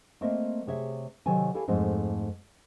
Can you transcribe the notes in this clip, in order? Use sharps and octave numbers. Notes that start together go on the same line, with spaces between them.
A3 A#3 C4 C5 D#5 E5
C3 G#4 C#5 E5
C3 D#3 F#3 A4 C#5 G#5
E4 G4 A4 C#5 F5 G#5
F2 G#2 A3 C4 D#4